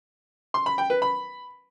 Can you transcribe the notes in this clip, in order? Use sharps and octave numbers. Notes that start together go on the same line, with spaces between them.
C6
B5
G5
B4
B5